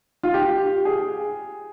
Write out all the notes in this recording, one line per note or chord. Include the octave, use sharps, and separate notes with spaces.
F4
G4
G#4